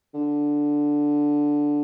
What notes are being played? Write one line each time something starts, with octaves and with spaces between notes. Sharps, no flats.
D3